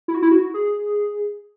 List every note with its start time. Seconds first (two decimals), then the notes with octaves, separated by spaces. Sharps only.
0.08 E4
0.15 F#4
0.22 E4
0.31 F#4
0.54 G#4